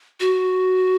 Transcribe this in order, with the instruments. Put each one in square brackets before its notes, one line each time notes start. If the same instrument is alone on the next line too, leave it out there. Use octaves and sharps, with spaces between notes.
[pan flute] F#4